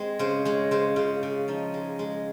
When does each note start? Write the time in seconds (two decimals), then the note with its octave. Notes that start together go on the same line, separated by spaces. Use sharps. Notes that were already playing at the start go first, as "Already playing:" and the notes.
Already playing: G#3 C4
0.19 C#3 C5
0.45 G#3 C#5
0.71 C#3 C5
0.96 C#3 F4
1.23 C#3
1.48 F3 D#4
1.74 G#3
1.99 G#3